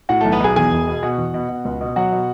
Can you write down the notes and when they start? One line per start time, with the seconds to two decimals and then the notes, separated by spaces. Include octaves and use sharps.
0.09 A2 F#4 F#5
0.21 B1 A3 A4
0.32 B3 B4
0.40 B1 G#4 G#5
0.56 E2 G#4 G#5
0.71 E1
0.87 B2
1.03 B2 F#4 F#5
1.18 E2
1.34 B2
1.49 B2
1.65 C#2
1.81 B2
1.96 F#3 F#4 F#5
2.12 B2